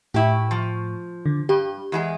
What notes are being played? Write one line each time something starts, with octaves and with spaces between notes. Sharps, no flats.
A2 E4 G4 C#6
F3
D3
G2 G4
E2 G#3 G#4